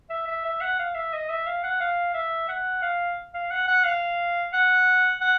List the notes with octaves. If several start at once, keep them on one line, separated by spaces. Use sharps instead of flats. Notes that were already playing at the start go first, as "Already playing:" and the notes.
E5
E5
E5
F#5
F5
E5
D#5
E5
F5
F#5
F5
E5
F#5
F5
F5
F#5
F#5
F5
F#5
F#5